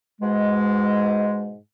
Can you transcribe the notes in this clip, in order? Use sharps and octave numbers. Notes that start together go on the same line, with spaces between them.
G#2 B2 G#3